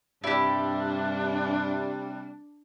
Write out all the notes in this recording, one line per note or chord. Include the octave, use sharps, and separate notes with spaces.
G2 C3 G3 D4 E4 G4